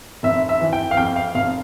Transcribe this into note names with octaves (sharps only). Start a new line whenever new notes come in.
F1 E5
E5
E3
G5
F5
F2 G5
F5
F1 F5